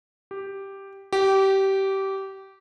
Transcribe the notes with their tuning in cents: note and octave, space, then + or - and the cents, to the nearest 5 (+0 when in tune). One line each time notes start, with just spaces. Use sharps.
G4 +0
G4 -20